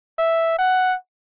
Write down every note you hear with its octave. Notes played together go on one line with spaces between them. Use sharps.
E5
F#5